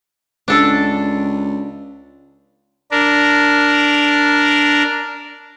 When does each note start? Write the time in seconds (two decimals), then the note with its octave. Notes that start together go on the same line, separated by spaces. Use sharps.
0.48 C#2 D4 A4
2.91 D4 A#4